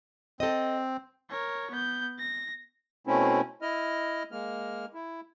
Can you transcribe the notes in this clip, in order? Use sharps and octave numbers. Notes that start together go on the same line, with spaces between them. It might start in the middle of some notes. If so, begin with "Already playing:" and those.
C4 A4 D#5
A#4 C#5
B3 G6
A#6
B2 A3 C4 C#4 E4
E4 D#5 F6
G#3 A#3 F6
E4